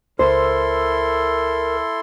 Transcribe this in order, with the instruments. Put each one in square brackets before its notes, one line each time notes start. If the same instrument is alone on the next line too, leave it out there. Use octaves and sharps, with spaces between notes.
[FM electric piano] C#2 [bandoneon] E4 A4 C6 [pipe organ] A#4 [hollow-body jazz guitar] C5